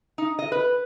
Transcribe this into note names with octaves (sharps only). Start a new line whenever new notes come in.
D#4
D#5
B4